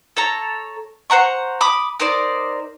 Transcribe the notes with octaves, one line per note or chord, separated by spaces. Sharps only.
A4 C#5 A#5
C5 F#5 A#5 C#6
B5 D6 D#6
D#4 A#4 C5 D5